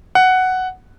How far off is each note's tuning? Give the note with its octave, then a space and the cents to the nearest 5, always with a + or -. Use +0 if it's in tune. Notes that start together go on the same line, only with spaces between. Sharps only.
F#5 +5